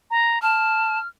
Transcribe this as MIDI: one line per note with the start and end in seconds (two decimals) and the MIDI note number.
0.11 0.41 82
0.42 0.98 81
0.42 1.07 89